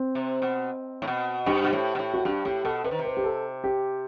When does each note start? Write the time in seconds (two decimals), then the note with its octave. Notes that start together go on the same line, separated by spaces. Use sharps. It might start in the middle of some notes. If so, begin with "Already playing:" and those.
Already playing: C4
0.15 C3
0.42 B2
1.02 A2
1.07 B2
1.46 G2 G4
1.64 B2
1.73 A2
1.95 B2
1.99 A2
2.14 F#4
2.25 G2 G4
2.45 A2 G4
2.64 B2 A4
2.84 C3 B4
2.91 D#3
2.99 C3
3.05 B4
3.17 G4
3.24 A4
3.64 G4